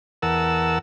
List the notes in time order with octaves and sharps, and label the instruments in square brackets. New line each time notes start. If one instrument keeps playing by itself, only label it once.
[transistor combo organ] E2 A#4 F#5 A5 E6